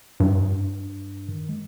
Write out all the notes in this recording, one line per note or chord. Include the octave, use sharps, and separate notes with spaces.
G2
D#3
G#3